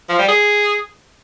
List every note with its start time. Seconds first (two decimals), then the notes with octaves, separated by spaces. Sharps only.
0.09 F3
0.19 G3
0.28 G#4